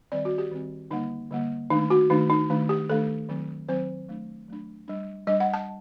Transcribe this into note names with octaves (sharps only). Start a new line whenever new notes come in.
D#3 G3 C4 D5
F#4
G4
D#3 G3 C4
D3 G3 A#3 D#4
D3 G3 A#3
D#3 A3 D4 D#4
F#4
D#3 A3 D4 D#4
D#4
D#3 A3 D4
G4
D#3 A3 D4 A4
D#3 F#3 C4
D#3 F#3 C4 C5
F#3 A3 D4
F#3 A3 D4
G3 D4
G3 D4 D#5
F#5
A5